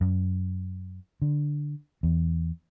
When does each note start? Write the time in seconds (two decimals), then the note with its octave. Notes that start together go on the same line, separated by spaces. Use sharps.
0.01 F#2
1.22 D3
2.03 E2